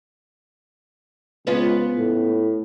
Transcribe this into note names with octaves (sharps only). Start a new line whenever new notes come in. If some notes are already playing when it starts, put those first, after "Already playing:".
C#2 B3 C#4 F4
A2